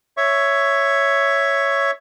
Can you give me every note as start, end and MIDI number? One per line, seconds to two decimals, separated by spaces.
0.17 1.91 73
0.17 1.91 76
0.17 1.91 85